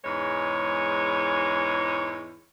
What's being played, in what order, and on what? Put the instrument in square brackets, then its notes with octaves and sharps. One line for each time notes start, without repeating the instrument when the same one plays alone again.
[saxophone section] E2 G#2 G#3 C#5